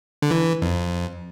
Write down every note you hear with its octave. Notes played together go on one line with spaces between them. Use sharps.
D3
E3
F2